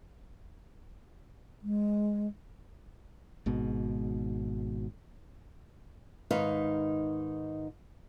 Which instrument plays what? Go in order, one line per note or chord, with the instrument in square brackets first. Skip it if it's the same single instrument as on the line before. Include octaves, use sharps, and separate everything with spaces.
[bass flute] G#3
[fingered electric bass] G#1 G#2 B2
[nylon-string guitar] G#2 D#3 D#4 B4 F5